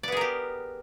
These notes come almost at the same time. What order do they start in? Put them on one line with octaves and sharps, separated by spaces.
D5 B3 G#4 A#4 G4